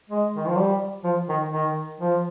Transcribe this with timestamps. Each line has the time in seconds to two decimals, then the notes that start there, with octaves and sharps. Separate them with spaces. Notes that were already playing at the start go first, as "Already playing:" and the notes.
0.10 G#3
0.36 D#3
0.47 F3
0.57 G3
1.04 F3
1.29 D#3
1.52 D#3
2.00 F3